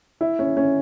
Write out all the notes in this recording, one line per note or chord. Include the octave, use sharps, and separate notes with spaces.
E4
C#4
C#4